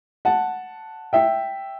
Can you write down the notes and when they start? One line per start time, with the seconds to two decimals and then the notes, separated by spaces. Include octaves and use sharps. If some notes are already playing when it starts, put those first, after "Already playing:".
0.25 F#5 A5
1.13 E5 G5